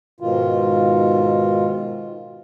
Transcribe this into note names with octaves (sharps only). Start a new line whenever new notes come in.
G#2 B2 D#3 F4